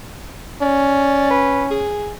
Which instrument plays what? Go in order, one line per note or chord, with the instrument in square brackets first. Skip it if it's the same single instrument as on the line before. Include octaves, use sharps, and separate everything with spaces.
[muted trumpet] C#4 [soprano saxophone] D5
[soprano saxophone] B4
G#4